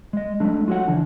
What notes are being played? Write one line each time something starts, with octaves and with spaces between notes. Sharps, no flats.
G#3 D#5
F#3 G#3 A3 D4
F4 F#4 A4 C#5 F#5
C#3 E3 F3 D4